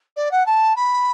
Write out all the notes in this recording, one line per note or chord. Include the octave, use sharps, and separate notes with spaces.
D5
F#5
A5
B5